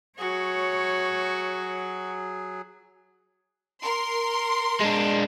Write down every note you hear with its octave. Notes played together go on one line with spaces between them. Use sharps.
F#3 F#4 G#4 C#5
A#4 C6
G#3 D4